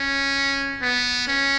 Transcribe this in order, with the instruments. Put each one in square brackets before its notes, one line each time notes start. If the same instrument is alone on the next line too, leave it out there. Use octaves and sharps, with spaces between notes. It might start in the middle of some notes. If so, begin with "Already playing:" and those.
Already playing: [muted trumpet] C#4
B3
C#4